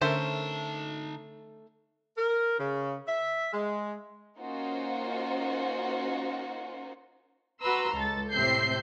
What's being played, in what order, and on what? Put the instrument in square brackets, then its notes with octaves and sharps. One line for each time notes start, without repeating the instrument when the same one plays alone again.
[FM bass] D3 [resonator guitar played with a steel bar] A3 C#4 A#4 [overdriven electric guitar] D#4 A5 [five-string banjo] C5 E5
[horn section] A#4
C#3
E5
G#3
[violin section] A#3 C#4 D#4 F4 F#4 C5
[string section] F#4 B4 A#5 C6 E6
C#2 A4 A6
A2 C3 C4 E5 G6 C7